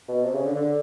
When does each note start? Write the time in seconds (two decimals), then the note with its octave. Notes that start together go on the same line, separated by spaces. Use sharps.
0.08 B2
0.25 C3
0.35 C#3
0.46 D3
0.56 D3